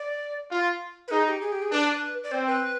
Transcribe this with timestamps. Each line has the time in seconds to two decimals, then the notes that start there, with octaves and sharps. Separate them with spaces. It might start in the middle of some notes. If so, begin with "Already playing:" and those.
Already playing: D5
0.51 F4
1.08 B4
1.11 D#4 G#4
1.27 G4
1.42 G#4
1.52 G4
1.62 G#4
1.71 D4 B4
2.24 D5
2.32 C4 C5
2.47 B4